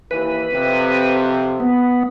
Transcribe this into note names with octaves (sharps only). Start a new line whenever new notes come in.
D#2 E3 B4
F2 C3
B3